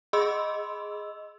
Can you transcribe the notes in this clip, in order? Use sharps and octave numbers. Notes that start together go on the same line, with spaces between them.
G#4 D#5 B5 C6 E6